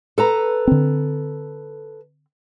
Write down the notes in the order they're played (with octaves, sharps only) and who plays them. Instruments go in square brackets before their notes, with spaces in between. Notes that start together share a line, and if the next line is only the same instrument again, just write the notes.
[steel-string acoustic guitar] A4 B4 A#5
[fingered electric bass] D3 C4